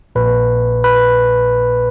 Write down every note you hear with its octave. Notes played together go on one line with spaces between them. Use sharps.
A#1 A#2 B4
B4